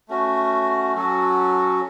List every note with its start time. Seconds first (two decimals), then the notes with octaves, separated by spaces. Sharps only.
0.09 A3 C#4 F#4
0.95 F#3 C#4 F#4 A4